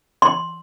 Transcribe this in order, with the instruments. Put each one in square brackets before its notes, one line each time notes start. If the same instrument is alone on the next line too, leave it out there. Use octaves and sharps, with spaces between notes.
[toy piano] C6